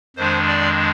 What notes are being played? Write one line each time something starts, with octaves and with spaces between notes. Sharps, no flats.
F2 D#3 G#3 D4 C5
D5